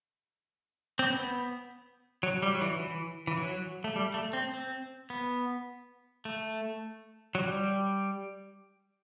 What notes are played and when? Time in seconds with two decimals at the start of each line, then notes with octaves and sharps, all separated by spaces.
0.99 C4
1.07 B3
2.23 F#3
2.42 G3
2.55 F#3
2.62 E3
2.80 E3
3.27 E3
3.37 F#3
3.84 A3
3.96 G3
4.14 A3
4.33 C4
4.53 C4
5.10 B3
6.25 A3
7.35 F#3
7.41 G3